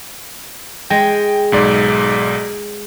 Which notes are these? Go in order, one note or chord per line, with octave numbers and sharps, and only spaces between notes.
G#3 G5
B1 G#2 D5